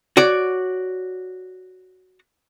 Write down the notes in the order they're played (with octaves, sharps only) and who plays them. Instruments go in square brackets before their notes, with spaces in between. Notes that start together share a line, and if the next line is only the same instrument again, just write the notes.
[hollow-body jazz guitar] F#4 C#5 D5